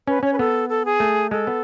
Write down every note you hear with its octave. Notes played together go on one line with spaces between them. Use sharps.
C#4 B4
C#4 C#5
B4
B3 A4
A4
G#4
A3
G#3 A4
B3